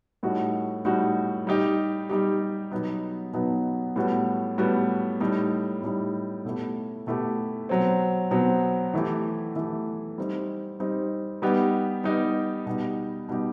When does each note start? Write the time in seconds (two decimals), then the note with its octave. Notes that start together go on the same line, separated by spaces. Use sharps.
0.23 A2 G3 D#4 F#4
0.85 A2 G3 D#4 F#4
1.47 G3 D#4 G4
2.10 G3 D#4 G4
2.71 B2 F#3 B3 D#4
3.33 B2 F#3 B3 D#4
3.96 A2 G3 B3 F#4
4.58 A2 G3 B3 F#4
5.20 A2 G3 D#4
5.82 A2 G3 D#4
6.45 B2 A3 E4 G4
7.07 B2 A3 E4 G4
7.69 B2 F#3 C4
8.31 B2 F#3 C4
8.94 E3 A3 E4 G4
9.56 E3 A3 E4 G4
10.18 G3 C4 D#4
10.80 G3 C4 D#4
11.42 G3 B3 D#4 G4
12.04 G3 B3 D#4 G4
12.66 B2 G3 D#4 G4
13.28 B2 G3 D#4 G4